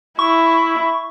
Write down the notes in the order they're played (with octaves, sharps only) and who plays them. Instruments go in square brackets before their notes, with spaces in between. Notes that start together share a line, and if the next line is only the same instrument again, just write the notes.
[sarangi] E4 [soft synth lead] C#6